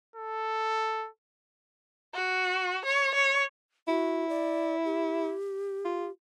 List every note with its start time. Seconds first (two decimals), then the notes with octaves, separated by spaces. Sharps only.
0.16 A4
2.14 F#4
2.85 C#5
3.15 C#5
3.88 E4 F#4
4.29 D5
4.85 G4
5.85 F4